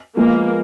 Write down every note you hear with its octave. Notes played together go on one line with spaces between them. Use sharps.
F3 G#3 A#3 B3